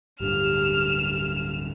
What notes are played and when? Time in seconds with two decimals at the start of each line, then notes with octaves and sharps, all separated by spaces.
0.20 D1 G2 D3 G4 F6 E7